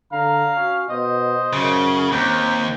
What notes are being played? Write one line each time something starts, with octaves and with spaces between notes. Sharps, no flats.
D3 F5 A#5
C#4 F#4
B2 C5 D#5
F#2 C#3
D#2 C4 G4 A#5